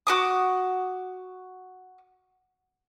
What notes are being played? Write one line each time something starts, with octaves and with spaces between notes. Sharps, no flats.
F#4 D6 D#6